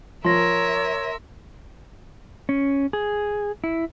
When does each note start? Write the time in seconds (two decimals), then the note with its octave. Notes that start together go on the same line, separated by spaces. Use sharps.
0.25 F3 A#4 C#5 E5 C6 A#6
2.49 C#4
2.93 G#4
3.64 E4